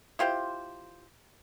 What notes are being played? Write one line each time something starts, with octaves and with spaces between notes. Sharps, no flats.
E4 F4 G4 C5